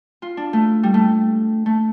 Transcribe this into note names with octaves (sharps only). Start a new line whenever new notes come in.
F4
D4
A3
G3
A3
A3